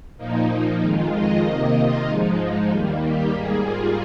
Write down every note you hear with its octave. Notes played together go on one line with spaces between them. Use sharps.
A#2 F3 A#3 D#4
F2 D#3 G#3 F4
D#5
C3 D#3 A#3 D#5
F4
G#2 F3 G#3 D#4
D#2 D#3 G3 A#3
G4
G#2 G3 A#3 G#4
F4